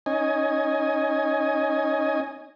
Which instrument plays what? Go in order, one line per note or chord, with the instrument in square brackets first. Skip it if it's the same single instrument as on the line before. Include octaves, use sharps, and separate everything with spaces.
[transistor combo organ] C#4 D#4 D#5 G#5